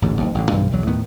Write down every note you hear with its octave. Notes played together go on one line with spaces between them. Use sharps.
A1 D2 G#2
F#1 D#2
A1 A2 D3
B1 G2 C3 E3
B1 E2 F#3
D#2 A2 D#3 B3